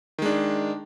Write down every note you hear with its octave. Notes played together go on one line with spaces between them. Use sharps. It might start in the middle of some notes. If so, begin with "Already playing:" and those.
D#3 G#3 D4